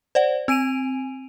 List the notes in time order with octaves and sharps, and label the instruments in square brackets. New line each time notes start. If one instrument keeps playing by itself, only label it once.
[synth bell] C5 D5 F#5
C4 G#5 D7 D#7 F7